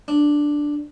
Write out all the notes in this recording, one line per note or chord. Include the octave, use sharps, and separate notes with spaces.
D4